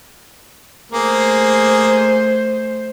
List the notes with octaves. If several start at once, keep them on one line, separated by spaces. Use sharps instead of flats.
A3 A#3 G#4 C5